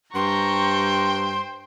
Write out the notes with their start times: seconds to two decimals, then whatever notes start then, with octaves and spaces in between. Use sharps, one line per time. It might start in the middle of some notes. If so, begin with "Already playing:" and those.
0.15 G2 C5 G5 A#5 C6 C#6